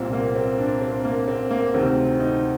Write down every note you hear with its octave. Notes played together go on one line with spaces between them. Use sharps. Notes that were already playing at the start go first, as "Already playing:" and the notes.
Already playing: C2 A#2 C4
A#3
C4
D4
C4
A#3
C4
A#3
D2 C3 D#3 C4
D#4